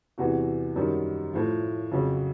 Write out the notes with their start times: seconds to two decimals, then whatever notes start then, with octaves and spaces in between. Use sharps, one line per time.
0.18 E2 C3 E3 F#4 F#5
0.76 F#2 D#3 G3
1.34 A2 F3
1.91 F2 C#3 F#3